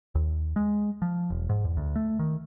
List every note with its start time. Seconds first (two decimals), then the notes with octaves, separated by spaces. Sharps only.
0.15 D#2
0.56 G#3
1.02 F3
1.30 E1
1.49 G#2
1.65 E2
1.77 D2
1.96 A3
2.19 D#3